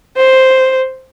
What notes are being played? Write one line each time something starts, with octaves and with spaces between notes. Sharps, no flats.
C5